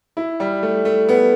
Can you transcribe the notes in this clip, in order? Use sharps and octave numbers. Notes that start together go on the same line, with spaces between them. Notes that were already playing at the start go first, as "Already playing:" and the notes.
E4
G3
A3
A3
B3